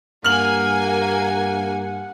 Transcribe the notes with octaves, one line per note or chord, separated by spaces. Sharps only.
G2 A#3 F#5 G#5 F6 F#7